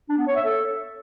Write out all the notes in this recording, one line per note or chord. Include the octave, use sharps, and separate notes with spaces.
D4
B3
C#5
E5
A4